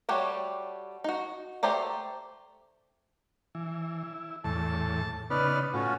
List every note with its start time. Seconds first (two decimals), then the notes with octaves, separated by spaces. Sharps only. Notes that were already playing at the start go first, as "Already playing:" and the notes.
0.09 G3 A3 F#4 G4 C#5
1.04 D#4 F#4
1.63 A3 G4 C5 D5 A#5
3.55 E3
4.03 E4
4.44 E2 A2 A5
5.30 C#3 B3 D#4 B4 D5 F6
5.74 A2 C#4 F4 F#4